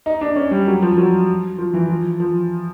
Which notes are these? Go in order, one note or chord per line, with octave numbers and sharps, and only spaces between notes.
D#4
D4
C#4
G3
F#3
F3
F#3
F3
E3
F3
F3